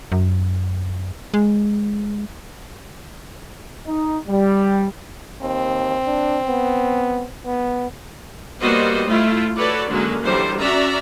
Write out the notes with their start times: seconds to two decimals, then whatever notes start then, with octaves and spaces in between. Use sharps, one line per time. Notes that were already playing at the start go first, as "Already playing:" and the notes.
0.12 F#2
1.34 G#3
3.87 D#4
4.28 G3
5.42 D#2 C4
6.06 D4
6.47 B3
7.45 B3
8.61 G3 A#3 B3 F#4 C5 D#5
9.07 A3 E4 F4
9.57 F#4 A4 B4 C#5 D5
9.89 D3 F#3 G#3 A#3 C#4
10.24 D3 E3 F#3 G3 C5
10.59 C#4 F#4 D5 E5 A#5